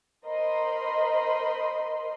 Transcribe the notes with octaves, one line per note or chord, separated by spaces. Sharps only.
A#4 C5 D#5 B5 C6